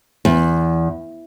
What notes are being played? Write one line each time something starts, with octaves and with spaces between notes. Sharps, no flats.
E2